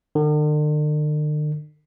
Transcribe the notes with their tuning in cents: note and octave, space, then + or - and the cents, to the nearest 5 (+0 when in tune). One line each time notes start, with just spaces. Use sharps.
D3 +45